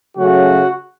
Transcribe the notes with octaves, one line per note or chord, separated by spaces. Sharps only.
C#3 F#3 A3 C#4 F#4